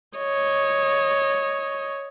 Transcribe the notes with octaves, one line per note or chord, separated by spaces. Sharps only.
C#5 D#5